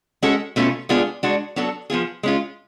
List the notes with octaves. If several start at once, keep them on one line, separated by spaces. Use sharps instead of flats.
G#3 C#4 F#4 A4
B2 A3 C#4 F4
G#3 B3 D4 F4 G#4
G#3 D4 F#4
F#3 B3 D4 F#4 A4
F3 B3 F4 G#4
G#3 C#4 F4